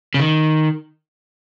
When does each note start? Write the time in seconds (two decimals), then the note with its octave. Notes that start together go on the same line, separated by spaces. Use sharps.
0.14 C#3
0.20 D#3